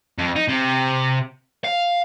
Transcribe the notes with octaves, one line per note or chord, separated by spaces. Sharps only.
F2
D#4
C3
F5